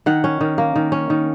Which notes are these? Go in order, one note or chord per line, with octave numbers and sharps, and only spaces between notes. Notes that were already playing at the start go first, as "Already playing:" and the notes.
D#3 F#5
C#4
D#3
A#3
D#3
C#4
D#3